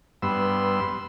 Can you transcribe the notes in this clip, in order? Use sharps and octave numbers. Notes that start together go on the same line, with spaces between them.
G2 B3 C6 E6